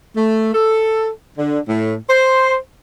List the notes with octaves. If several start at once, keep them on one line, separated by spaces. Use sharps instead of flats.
A3
A4
D3
A2
C5